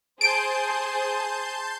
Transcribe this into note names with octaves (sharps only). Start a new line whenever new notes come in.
G#4 C5 A5 C6 G6 D7